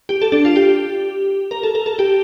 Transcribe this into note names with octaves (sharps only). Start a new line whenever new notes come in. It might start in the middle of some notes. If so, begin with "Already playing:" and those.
G4
A4
D4
F4
G4
A#4
A4
A#4
A4
G4